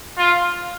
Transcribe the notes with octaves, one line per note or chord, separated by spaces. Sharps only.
F4